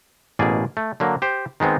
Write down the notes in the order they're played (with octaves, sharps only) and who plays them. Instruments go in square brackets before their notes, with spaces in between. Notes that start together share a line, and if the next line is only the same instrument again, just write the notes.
[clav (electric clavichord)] A1 B2 A#3 G#4 D5
A3
D3 F#3 A#3
G4 C5
D#3 G#3 B3 C4